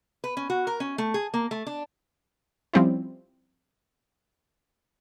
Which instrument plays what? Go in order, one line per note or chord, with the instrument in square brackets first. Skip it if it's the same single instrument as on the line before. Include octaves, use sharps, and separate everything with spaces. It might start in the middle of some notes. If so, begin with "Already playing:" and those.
[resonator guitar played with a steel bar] B4
C#4
F#4
A#4
C#4
A3
G#4
A#3
A3
D4
[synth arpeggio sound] F3 G3 C4 C#4 E4